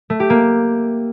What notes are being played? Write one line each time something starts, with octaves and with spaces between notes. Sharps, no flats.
A3
G4
A#3